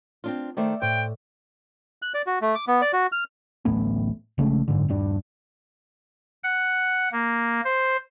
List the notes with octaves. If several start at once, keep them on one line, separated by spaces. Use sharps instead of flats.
C4 D4 F4
D#3 A3 C5 D5 E5 A6
A2 C5 G5
F#6
D5
F#4
A3
D6
B3
D5
F#4
F6
D1 A1 A3 B3
A#1 C#3 G#3 A3
F#1 B1 G#2 D3
D#1 G2 D4
F#5
A#3
C5